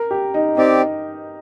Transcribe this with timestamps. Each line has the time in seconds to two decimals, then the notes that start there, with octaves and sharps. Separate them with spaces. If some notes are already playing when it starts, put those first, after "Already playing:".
Already playing: A#4
0.11 G4
0.34 D#4
0.57 C4 D#4 G4 D5